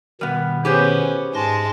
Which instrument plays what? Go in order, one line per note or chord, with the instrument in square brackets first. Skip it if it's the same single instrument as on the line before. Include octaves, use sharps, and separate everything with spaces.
[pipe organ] B2 D#3 [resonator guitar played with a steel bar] G3 B3
[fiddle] B3 C#4 [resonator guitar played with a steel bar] G4 G#4 C5
[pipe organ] G#2 C6 A#6 [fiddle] G#3 A5